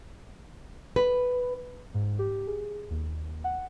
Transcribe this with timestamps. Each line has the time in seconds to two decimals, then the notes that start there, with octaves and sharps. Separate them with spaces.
0.96 B4
1.94 G#2
2.19 G4
2.47 G#4
2.91 D#2
3.44 F#5